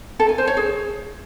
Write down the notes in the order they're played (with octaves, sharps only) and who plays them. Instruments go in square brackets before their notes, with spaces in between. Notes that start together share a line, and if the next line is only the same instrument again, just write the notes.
[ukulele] A4
G#5
C5
C#5
G#4